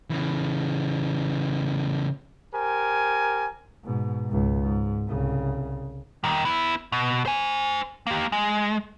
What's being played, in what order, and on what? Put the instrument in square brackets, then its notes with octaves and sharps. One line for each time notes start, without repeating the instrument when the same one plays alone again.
[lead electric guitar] C#3 E3
[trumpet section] G4 A#4 C5 G#5
[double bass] G#2 B2
C#2 G#2
G#2
C2 C#3
[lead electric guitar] D#3 G3
B3 E4
B2
C5 G#5
A#3 G4
G#3